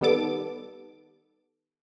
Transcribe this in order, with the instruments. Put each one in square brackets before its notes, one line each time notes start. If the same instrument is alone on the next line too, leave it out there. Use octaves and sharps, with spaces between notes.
[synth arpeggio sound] D#3 G3 B3 A4 D6